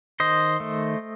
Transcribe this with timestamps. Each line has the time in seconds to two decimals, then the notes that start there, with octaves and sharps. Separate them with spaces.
0.20 D#3 C5 D#5
0.60 A3